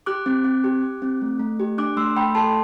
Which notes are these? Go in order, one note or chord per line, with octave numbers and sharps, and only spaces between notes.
G4 D6 F#6
C4
C4
G4
G4
C4
A3
A3
G4
D4 D6 F#6
A3 C6 E6
A3 G5 B5
A4 A5 C6